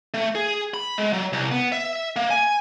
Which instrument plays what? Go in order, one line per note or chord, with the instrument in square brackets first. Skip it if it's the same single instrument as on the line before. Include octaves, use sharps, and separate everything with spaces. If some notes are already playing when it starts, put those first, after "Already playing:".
[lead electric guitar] A3
G#4
B5
G#3
F#3
C2
B3
E5
A#3
G#5